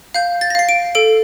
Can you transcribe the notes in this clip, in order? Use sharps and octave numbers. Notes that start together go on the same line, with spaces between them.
F5 G6
A6
A#6
F5 C7
D7
A4 D7